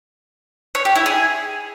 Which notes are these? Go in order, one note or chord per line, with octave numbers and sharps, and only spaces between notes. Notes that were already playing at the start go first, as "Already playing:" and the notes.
C#5
G4
E4
G#4